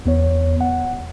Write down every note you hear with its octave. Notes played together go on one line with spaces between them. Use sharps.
E2 B3 C#5
F#5